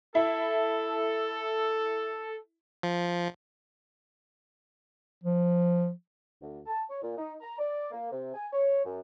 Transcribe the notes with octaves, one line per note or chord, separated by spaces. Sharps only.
E4 A4
F3
F3
D2
A5
C#5
A#2
D#4
A#5
D5
A#3
C3
G#5
C#5
F#2